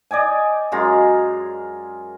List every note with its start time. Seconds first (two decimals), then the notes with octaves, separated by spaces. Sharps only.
0.11 D5 D#5 G5 G#5
0.72 F#2 G#3 F4 A#5